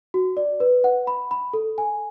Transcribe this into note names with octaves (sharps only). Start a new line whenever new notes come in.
F#4
D5
B4
F#5
B5
B5
A4
G#5